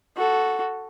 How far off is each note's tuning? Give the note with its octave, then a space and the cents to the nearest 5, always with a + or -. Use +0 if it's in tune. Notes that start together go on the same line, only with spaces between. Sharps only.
F#4 +0 A4 +0